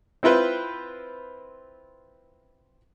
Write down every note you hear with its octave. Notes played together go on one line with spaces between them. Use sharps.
C4 E4 F4 B4 C5